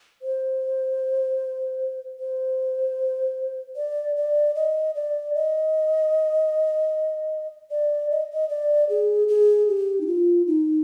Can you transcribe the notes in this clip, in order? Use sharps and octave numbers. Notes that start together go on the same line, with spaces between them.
C5
C5
D5
D5
D#5
D5
D#5
D5
D#5
D#5
D5
G#4
G#4
G4
D#4
F4
D#4